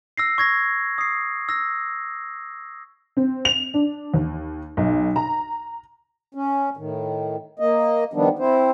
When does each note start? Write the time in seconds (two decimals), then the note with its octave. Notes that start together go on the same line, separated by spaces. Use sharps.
0.17 E6 A#6 C7
0.38 C#6 G#6 A#6
0.98 D#6 C7
1.49 E6 A#6
3.17 C4
3.45 F7
3.74 D4
4.14 D#2
4.77 B1
5.16 A#5
6.35 C#4
6.77 A2 D#3
7.59 A#3 D#5
8.13 D#3 F3 G3 B3 D4
8.39 C4 E4 C5